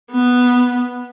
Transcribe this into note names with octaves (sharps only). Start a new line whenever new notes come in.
B3